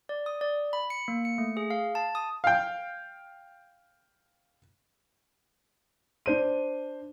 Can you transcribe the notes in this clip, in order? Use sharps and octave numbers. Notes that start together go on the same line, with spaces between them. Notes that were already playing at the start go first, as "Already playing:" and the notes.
D5
D#6
D5
B5
C#7
A#3
C#7
A3
G#4
F5
A5
D#6
F5 G5
D4 C5 D#7